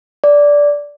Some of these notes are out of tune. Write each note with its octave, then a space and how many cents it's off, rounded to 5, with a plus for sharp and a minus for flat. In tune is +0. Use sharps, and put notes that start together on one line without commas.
D5 -10